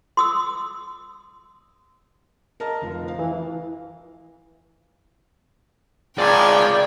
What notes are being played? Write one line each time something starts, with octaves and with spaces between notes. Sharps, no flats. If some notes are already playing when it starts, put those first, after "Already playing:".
C6 D#6 E6
A#4 D#5 A5
F1 F4
F3 F5
E3
G#1 G#3 F4 D5 G5 G#5